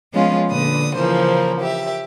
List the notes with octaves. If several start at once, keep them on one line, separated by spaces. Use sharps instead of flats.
F3 G#3 B3 C#4 F4
A#2 D3 B4 D#6
C#3 E3 F3 A#3 C5
G4 E5